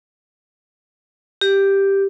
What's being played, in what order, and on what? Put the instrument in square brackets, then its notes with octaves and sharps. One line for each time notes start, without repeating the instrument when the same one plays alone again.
[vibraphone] G4